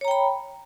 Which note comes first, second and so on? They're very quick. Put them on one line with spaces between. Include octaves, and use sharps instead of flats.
C#5 A#5 G5 B5